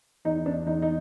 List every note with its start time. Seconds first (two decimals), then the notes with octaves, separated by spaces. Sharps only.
0.25 E2 D#4
0.46 D4
0.66 E2 D#4
0.82 D#4